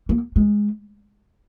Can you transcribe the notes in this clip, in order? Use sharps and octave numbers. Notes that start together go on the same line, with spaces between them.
A#3
G#3